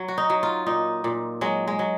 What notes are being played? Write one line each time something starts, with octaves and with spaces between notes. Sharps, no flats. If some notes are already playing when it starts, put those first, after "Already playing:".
Already playing: F#3
F#4
D#4
F#3
F4
A#2 D#4
A#2
F#3 G#3
G#3
F#3